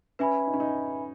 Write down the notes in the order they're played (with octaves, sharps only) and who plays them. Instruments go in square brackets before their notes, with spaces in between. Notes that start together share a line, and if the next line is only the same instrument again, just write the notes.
[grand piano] C#4 [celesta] B4 E5 G#5 B5
[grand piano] D#4
C#4
D#4